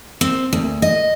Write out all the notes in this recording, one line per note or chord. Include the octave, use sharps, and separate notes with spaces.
C4
D2
D#5